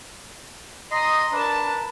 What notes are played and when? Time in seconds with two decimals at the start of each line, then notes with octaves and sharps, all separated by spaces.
0.91 D#5 A#5 C6 D#6
1.32 D4 A#4 B4 A5